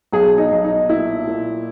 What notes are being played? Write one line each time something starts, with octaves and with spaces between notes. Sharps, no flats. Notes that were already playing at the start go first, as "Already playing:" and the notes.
B1 G#4
D#4
B1
D#4
A#2 E4
A#2